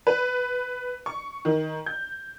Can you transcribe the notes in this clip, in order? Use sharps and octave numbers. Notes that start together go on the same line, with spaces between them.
B4
C#6
D#3
G6